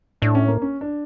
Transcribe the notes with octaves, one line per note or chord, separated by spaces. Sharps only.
A2 D4
C#4
A#3
C#4
D4